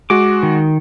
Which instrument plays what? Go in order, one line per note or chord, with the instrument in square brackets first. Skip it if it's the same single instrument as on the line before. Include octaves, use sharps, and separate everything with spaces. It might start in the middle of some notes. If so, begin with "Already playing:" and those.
[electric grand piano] G#3 F#4 [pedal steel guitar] D6
[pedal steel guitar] D#3